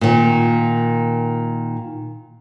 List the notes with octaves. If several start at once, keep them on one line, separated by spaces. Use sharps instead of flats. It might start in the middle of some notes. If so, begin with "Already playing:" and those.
A#2 D#3